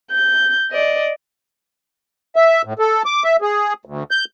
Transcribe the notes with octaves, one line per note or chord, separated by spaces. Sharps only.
G6
D5 D#5
E5
A2
A4
D6
E5
G#4
D2
G6